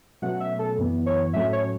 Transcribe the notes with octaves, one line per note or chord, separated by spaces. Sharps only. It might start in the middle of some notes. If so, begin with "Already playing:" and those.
B2 F#3 A3 C#4 F#5
E5
A4
F#2 E3 B3
C#5
A2 F#3 A3 C#4 E5
C#5